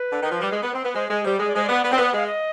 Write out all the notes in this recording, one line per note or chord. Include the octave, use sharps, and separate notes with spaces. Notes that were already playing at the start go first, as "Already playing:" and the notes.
Already playing: B4
D3
D#3
F3
G3
G#3
B3
C4
B3
G#3 C5
G#3 G#4
G3 C5
G#3 D#5
D5
G#3 C5
D5
B3
B3
C4
B3
G#3 F5
D#5